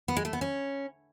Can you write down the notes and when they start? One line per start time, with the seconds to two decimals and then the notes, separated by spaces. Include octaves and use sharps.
0.08 B3
0.17 G#3
0.25 A3
0.33 B3
0.41 C#4